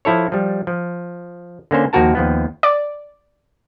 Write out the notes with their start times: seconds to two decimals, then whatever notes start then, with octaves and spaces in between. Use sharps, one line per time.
0.05 F3 E4 A4 C#5
0.32 F3 G3
0.67 F3
1.71 D3 A#3 C#4 C5
1.93 D#2 F3 A#3 F#4 A#4 A5
2.15 D#2 F3 B3
2.63 D5